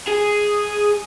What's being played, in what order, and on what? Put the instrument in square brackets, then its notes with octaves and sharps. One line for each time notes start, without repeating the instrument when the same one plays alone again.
[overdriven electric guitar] G#4